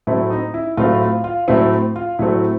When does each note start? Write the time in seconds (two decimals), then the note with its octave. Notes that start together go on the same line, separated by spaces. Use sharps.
0.07 A2 F#3 A3 C4 E4
0.30 D#4
0.54 E4
0.77 A2 F#3 A3 C4 F4
1.01 F4
1.24 F4
1.48 A2 F#3 A3 C4 E4
1.96 F4
2.19 A2 F#3 A3 C4 E4